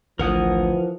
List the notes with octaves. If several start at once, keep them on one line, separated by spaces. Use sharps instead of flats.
A1 D2 E3 F3 A#4 F#5 D#6